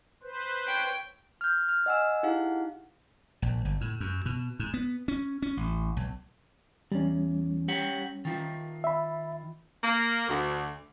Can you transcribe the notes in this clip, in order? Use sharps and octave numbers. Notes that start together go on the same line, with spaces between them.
B4 C5
C#5 G5
F6 G6
F6
D#5 F#5 G#5 E6
D#4 E4 G4 G#4 F5 F#5
A#1
G1
A2
F#2
B2
G#2
B3
C#4
C#4
A1
B1
E2 G3 C#4
G4 C#5 F#5
D#3 F4
E5 B5
A#3
D2